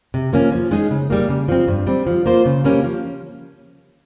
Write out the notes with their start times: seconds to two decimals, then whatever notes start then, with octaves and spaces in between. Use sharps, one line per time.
0.14 C3
0.33 F3 A#3 C#4
0.52 F3
0.71 G#3 D#4 G#4 D#5
0.91 C#3
1.10 G3 A#3
1.29 C#3
1.48 F3 C4
1.68 G2
1.87 G3 C4
2.07 F3
2.26 A#3 F4 C5
2.46 C#3
2.64 G3 A#3 C#4 G4
2.84 F3